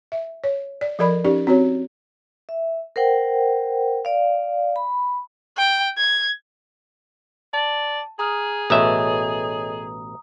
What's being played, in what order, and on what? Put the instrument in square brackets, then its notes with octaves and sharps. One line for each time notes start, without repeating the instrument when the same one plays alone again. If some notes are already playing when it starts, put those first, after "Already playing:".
[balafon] E5
C#5
D5
F3 A4 A#4 D5 B5
C#4 D#4 G4 D5
C4 F#4 C#5
[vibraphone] E5
A#4 C5 F#5 G5
D5 F5
B5
[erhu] G5
G#6
[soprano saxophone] D5 [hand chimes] A5
[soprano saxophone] G#4 [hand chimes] A#5 D#6 F6
[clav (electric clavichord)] A1 B2 E5 [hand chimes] A4 C#5 D#5 [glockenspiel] A#5 D#6